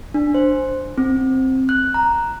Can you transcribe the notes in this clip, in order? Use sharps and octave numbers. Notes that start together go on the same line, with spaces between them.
D4
C5
C4
F#6
A#5